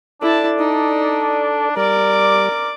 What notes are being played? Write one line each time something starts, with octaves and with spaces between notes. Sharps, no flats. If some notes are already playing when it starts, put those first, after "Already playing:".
D4 E4 A4 D5 A5
D#4
G3 A#4 D5 D6